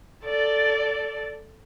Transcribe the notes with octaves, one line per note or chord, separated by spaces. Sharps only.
A4 D5